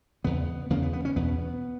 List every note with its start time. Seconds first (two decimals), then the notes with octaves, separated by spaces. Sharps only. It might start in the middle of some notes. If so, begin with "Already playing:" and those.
0.24 E2 C#3 B3
0.70 E2 C#3 A#3
0.83 B3
0.93 B3
1.05 C#4
1.16 E2 B2 B3